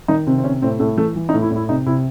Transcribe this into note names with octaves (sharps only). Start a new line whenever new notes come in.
D#3 D#4
C3 C4
C4
C3 C#4
A2 C4
A2 A3
E3 A3
E3
D#4
A2
E4
A2
E4
C3 D#4
C3 E4